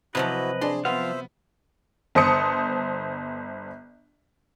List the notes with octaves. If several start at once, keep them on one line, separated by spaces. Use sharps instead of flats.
C3 F3 F#3 E4 F#4 B4 D#5
D4 G#4 C6
F3 B3 F4 C5 E5 F5
G1 C5 A5 D#6 C#7